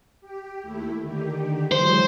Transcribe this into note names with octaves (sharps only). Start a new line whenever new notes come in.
G4
D#2 A3 E4
D3 D#3 G4
E3 F#3 G#3 C5